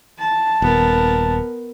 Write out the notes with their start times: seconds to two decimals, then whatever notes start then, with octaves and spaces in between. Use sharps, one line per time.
0.19 A5
0.62 D#1 B3 A#4